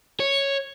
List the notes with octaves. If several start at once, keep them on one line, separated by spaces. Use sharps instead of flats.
C#5